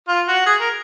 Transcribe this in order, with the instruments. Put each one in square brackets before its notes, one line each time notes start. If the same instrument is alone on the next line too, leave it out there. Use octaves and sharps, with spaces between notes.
[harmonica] F4
F#4
G#4
A#4